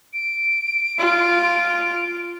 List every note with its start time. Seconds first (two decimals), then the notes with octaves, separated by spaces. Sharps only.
0.13 D7
0.99 F4